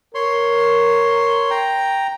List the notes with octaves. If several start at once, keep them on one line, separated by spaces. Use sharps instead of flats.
A#4 C#5 C6
G5 A#5